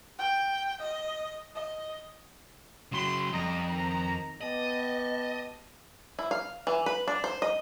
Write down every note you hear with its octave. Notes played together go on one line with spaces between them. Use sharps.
G5
D#5
D#5
F#2 C#3 F#3 B5 C6
F2 G3 D#5 A#5
D#3 A#5
B3 G4 D#5 A5
E4
F5
E3
B4
D4
C5
D#5